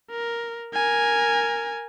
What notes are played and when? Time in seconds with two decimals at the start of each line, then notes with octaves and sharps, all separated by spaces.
0.10 A#4
0.74 A#4 G#5